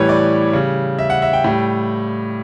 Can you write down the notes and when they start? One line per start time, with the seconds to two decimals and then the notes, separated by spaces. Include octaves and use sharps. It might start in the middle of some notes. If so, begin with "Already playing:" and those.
Already playing: A2 E3 G3 B4 C#5
0.09 D5
0.53 C#3 G3
0.99 E5
1.10 F#5
1.22 E5
1.33 G5
1.44 A2 G3